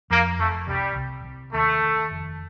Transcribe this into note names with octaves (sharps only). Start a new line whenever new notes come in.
F2 A#3
F1 A3
C2 G3
C2
C2
D#2 A3
D#3
F1